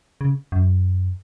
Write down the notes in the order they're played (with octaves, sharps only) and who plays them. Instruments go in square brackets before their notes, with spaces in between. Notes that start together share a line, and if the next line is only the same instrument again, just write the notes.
[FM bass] C#3
F#2